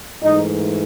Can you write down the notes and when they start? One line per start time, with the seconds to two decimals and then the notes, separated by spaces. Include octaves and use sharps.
0.23 G#2 E3 A3 D#4